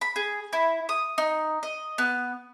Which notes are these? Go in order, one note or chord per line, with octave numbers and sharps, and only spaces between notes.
B5
G#4
E4
D#6
D#4
D#5
B3